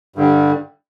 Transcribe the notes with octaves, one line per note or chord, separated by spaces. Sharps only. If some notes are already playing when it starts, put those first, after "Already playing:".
G2 D3 G3